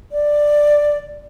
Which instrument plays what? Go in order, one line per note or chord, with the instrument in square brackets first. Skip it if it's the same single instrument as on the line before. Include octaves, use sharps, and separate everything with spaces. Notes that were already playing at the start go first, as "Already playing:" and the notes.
[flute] D5